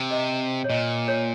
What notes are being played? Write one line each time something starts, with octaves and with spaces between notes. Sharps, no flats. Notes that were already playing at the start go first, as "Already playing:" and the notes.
Already playing: C3
D#5
C#5
A#2 D#5
C#5